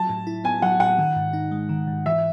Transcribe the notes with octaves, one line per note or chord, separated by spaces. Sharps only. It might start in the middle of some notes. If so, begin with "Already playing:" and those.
Already playing: F#3 A5
A2
E4
B3 G#5
F#3 F#5
A2 F#5
D#3
G#2
D#4
G#3
D#3
G#2
E3 E5